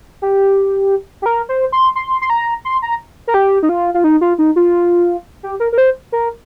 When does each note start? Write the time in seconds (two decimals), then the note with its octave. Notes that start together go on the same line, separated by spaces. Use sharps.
0.22 G4
1.22 G4
1.26 A#4
1.49 C5
1.72 C6
1.95 C6
2.21 C6
2.30 A#5
2.65 C6
2.82 A#5
3.27 A#4
3.34 G4
3.63 D#4
3.69 F4
3.94 F4
4.04 D#4
4.21 F4
4.39 D#4
4.56 F4
5.43 G4
5.60 A#4
5.72 A#4
5.78 C5
6.12 A#4